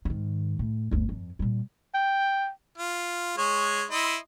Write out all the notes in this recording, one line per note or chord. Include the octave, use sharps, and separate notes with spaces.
G#2 D#3
A2
G1 D2
F2
A#2 G3
G5
F4
G#3 C#5
E4 D#5 C6